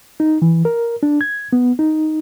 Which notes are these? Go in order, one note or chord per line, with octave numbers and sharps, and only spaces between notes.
D#4
E3
A#4
D4
G#6
B3
D#4